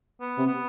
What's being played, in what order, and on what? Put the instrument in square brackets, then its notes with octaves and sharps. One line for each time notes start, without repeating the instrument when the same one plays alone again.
[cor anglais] B3
[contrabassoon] C3
[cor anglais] B3